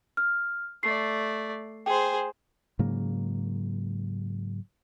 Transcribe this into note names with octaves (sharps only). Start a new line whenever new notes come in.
F6
A3 D5 C7
G#4 C5 G5
G#2 C#3 F#3 A#3